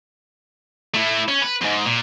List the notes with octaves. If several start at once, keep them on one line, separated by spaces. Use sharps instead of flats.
A3 E4
C#4
B4
F2 G#2
A#2